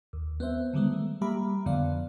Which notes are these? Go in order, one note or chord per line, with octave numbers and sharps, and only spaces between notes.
D#2
B3 C4 C5 E5
D3 D#3 G3 G#3 B3
A3
G3 A#3 G4 E5 A#5 B5
F2 D3 F3 B3 D5 F5